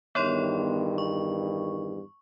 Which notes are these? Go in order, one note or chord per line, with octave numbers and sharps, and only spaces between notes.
E2 G2 D#3 B3 C#5 C6
C#6